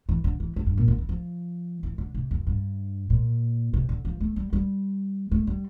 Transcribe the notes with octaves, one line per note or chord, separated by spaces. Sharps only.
E3
D3
E3
E3
G2
A#2
D3
E3
F3
E3
D3
C3
F2
G2
A#2
C3
D3
F3
A3
G3
G3
A3
G3